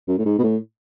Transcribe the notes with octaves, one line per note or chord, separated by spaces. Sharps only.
F#2
A2
G#2
B2
A2